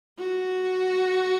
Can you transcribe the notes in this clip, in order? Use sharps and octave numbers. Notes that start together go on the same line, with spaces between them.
F#4